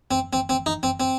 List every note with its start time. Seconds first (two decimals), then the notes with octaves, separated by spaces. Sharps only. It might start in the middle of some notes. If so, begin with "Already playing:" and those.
0.11 C4
0.33 C4
0.49 C4
0.66 D#4
0.83 C4
1.00 C4